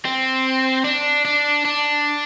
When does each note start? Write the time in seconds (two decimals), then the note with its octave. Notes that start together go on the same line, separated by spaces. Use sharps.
0.05 C4
0.85 D4
1.25 D4
1.65 D4